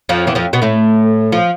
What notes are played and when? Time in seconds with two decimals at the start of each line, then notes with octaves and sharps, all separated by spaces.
0.09 F2 F3
0.27 E2 E3
0.35 F2 F3
0.53 B2 B3
0.62 A2 A3
1.32 F3